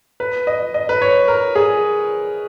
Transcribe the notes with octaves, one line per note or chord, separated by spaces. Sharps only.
B4
D#5
D#5
B4
C#5
A#4
G#4